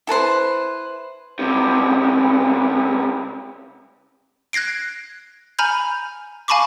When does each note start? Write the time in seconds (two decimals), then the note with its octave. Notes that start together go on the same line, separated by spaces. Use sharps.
0.07 E4 A4 B4 C5
1.39 C#2 C3
4.53 F#6 G#6 A#6 C7 D7
5.59 G#5 A#5 B5 F6 G6
6.48 F5 G#5 A5 B5 C#6 D6